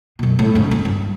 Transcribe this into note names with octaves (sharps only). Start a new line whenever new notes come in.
F#2 B2
A2
G#2 C#3
C#4
G2